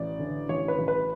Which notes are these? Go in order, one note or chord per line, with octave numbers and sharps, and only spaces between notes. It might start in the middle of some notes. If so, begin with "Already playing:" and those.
Already playing: A1 D5
D3
A1 C#5
B4
A1
B4